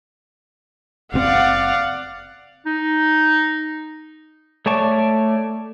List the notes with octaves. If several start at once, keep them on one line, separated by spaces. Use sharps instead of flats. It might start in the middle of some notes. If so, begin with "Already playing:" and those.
F#1 A2 C4 D5 F5 F#5
D#4
A3 C#5 D5 A5 C#6